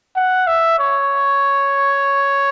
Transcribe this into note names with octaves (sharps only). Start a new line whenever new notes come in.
F#5
E5
C#5